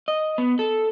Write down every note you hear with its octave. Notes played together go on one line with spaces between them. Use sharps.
D#5
B3
A4